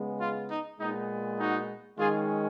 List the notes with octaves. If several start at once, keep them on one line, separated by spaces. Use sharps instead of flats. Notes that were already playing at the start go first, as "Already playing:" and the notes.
Already playing: C#3 G#3 B3
F4
D#4
A#2 G#3 B3 D#4
D#4 F#4
D#3 G#3 C#4 F4 G#4